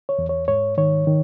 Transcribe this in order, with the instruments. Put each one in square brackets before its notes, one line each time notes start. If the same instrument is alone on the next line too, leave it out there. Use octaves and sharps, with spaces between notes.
[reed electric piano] C#5
E2
C#5
G#2 C#5
D#3 C#5
D#3